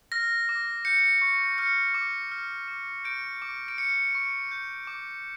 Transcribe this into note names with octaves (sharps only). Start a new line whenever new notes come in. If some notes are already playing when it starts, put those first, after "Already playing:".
F6 A#6
D6
G6 C#7
C#6
F6 C#7
D6
F6
D6
G6 D7
D6
D7
F6 C#7
C#6
G6
D6